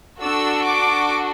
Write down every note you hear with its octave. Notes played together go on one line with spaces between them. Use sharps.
D4 F#4 A4 E6
D6